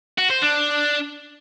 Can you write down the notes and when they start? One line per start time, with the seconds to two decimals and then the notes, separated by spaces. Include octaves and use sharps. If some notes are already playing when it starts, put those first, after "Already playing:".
0.18 F#4
0.30 C5
0.42 D4